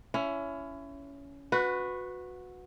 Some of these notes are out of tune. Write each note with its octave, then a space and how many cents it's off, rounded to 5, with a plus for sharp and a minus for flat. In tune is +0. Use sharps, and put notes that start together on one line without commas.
C#4 +20 E4 +25
F#4 -15 B4 +10